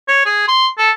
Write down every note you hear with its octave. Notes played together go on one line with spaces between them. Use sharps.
C#5
G#4
C6
A4